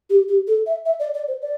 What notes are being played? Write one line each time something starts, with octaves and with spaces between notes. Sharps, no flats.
G4
G4
A4
E5
E5
D5
D5
C5
D5